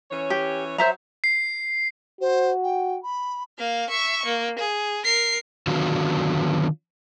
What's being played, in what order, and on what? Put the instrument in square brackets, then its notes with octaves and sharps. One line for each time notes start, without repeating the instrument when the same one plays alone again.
[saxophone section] E3 C#4 C#5
[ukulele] G4
[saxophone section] F#3 [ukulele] C5 E5 A#5
[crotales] C7
[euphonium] F#4 [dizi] C5
[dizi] G5
B5
[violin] A#3 F5
E5 C#6
A#3
G#4
A#4 C7
[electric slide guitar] D3 D#3 F#3 B3 F4 F#4